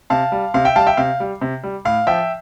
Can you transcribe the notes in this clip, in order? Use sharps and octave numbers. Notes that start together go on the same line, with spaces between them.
C3 F5 A5
G3
C3 F5
E5 G5
G3 F5 A5
E5 G5
C3 F5
G3
C3
G3
A2 F5
F3 E5 G5